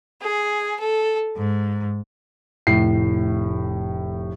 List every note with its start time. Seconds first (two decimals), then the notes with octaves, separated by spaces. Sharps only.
0.21 G#4
0.80 A4
1.35 G#2
2.67 F1 A2 C7